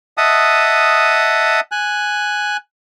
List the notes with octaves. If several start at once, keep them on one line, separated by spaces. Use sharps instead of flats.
D#5 E5 F#5 A5 D#6
G#5 F#6